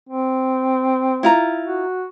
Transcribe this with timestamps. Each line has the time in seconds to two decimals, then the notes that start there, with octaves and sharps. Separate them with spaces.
0.09 C4
1.23 E4 F4 A#5
1.63 F#4